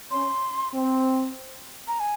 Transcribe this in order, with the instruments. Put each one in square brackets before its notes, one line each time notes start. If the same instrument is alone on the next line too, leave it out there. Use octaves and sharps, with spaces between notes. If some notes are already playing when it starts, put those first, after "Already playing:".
[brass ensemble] C#4 [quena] C6
[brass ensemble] C4
[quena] A#5
G#5